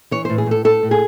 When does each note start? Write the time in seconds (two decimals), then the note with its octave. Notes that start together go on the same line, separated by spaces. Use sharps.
0.11 E3 C#5
0.25 A2 C5
0.38 G#4
0.46 A2 A4
0.64 A2 A4
0.83 A2
0.91 G#4